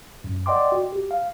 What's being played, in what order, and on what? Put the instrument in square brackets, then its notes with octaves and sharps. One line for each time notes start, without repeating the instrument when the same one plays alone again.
[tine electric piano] F#2
D5 D#5 F#5 G5 C6 D6
F#4
G4
F5